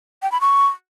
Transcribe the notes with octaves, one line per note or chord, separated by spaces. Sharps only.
G5
B5
C#6